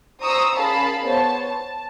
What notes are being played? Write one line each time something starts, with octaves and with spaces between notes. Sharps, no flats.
C5 A#5 C#6 D#6 E6
C#4 G#4 A#4 F5 A5 B5
B3 C5 C#5 A5
A5